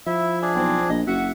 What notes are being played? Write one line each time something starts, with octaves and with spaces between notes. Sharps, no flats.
F3 E4 E5
D4 G#4
B1 C4
A#1 D#5
F#1 F#4 E5 F#5